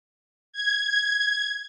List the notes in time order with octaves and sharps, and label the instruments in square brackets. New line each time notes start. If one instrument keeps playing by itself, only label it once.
[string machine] G#6